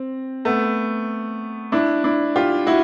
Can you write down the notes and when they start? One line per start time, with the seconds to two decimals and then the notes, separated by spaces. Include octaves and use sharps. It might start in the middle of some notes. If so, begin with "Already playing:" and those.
Already playing: C4
0.45 A3 B3
1.72 D4 E4
2.04 D4 E4
2.36 F4 G4
2.67 E4 F#4